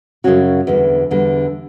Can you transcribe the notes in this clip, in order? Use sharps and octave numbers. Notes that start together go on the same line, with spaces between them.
F#2 C#3 G3 C#4 F#4
E2 D3 G3
E2 D3 G3